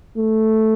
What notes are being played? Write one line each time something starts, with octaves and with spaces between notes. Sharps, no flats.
A3